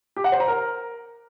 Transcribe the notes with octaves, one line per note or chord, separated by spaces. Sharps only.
G4
F#5
C5
A#5
A#4